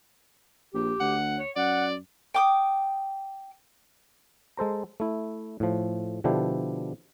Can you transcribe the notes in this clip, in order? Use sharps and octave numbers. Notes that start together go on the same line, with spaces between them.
A#1 G4
D2 F#5
C#5
F#2 D5 F#5
G5 D6 D#6
G#3 A4 C5 A#5
A3 E4
A2 F3
B2 D3 F3 D4 E4 G4